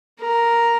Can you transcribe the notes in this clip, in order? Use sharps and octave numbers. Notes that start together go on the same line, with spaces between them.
A#4